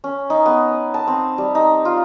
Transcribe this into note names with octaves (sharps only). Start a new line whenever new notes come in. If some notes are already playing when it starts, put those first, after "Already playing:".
C#4
D#4
B3
D#6
A5
C4
G3
D#4
F4